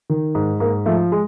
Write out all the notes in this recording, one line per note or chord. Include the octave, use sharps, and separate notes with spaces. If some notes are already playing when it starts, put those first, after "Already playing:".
D#3
G#2
G#2 A#3
F3 A3
G#3